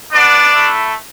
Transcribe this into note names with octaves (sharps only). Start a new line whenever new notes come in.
B3 D4 F#4 D5
A3 E4